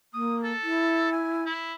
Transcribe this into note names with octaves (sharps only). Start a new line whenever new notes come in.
A#3 D#6
A4
E4
G#5
E4